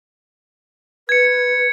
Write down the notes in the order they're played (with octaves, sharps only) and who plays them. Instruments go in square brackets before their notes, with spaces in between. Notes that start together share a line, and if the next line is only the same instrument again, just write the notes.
[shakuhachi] B4 [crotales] G#6 C#7